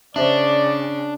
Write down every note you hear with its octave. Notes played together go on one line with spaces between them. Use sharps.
C#3 D4 C5 D5 E5